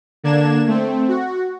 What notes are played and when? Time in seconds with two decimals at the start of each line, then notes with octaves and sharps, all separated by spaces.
0.24 D3 A#3 D4 G#6 E7
0.67 A3 C4
1.08 F#4